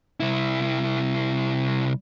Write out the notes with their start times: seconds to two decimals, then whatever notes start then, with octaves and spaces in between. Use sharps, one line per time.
0.20 C2 E4